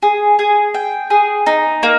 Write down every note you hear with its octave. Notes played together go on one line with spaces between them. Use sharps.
G#4
G#4
G5
G#4
D#4
A#3